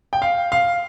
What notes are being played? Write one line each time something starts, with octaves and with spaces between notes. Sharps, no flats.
G5
F5
F5